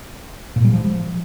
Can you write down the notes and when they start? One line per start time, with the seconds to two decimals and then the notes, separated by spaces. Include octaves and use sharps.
0.56 A#2
0.64 G3
0.73 F3